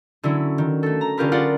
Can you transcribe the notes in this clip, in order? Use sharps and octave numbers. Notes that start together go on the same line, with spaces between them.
D3 F#3 C#4 E4
D#3
A3 A4
A#5
D3 C#4 F4 G4 A#4 B4
F4 G#4 D5 F#5